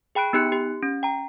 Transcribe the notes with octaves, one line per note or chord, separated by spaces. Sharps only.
G#4 G5 B5 F#6 D7
B3 D#4 G4 F#6 C#7
G4
C#4
G5 A#5